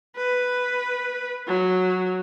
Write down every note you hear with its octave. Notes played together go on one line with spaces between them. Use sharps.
B4
F#3